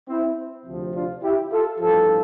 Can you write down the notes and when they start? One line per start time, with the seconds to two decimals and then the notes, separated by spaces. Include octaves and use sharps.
0.09 C4 E4
0.66 D2 C3 F3
0.94 D4 F4
1.23 E4 G4
1.51 F4 A4
1.79 A1 G2 F3 F4 A4